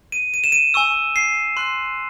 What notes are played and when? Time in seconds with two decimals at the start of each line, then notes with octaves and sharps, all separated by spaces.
0.12 D#7
0.34 D#7
0.44 E7
0.52 D#7
0.74 G#5 C#6 E6
1.16 C7
1.57 C6 F#6